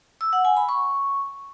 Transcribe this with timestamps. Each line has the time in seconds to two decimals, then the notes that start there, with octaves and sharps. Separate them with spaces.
0.21 E6
0.33 F#5
0.45 G#5
0.57 B5
0.69 C#6